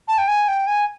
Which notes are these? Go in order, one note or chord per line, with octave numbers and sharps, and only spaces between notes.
A5
G5
G#5
G5
G#5